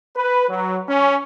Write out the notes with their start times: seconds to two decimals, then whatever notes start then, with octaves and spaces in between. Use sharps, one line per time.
0.14 B4
0.47 F#3
0.87 C#4